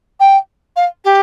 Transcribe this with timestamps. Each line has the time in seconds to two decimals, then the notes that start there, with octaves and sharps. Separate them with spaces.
0.19 G5
0.76 F5
1.04 G4